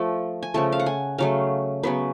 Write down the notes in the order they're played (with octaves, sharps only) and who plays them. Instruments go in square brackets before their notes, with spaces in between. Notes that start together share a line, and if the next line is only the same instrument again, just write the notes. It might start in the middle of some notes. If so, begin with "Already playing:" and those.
Already playing: [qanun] F3 A3
G#5
C#3 F3 A3 A5
F5
F#5
G#5
C#3 F#3 A3 F5
C#3 F#3 B3 B4